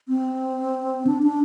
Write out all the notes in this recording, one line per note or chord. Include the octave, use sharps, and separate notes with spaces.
C4
D4
D4